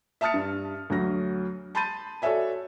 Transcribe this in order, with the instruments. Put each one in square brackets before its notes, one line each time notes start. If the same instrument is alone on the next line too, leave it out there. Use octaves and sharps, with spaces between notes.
[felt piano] E5 A5 D#6 F6 A6 C#7
G2
D2 F#3 A#6
A5 B5 C6 G6 A6 D#7
F#4 A4 C#5 D5 E5 G#5